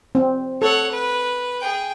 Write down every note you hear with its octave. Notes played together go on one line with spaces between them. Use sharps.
C4
A4 C#5 F#5
B4
G#4 G5